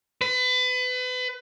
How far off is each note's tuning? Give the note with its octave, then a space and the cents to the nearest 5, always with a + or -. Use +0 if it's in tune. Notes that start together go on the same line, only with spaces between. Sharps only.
B4 +30